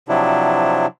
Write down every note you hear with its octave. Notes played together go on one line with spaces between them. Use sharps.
C3 F3 F#3 D4 E4